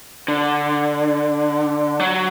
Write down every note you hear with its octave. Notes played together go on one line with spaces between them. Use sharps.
D3
F#3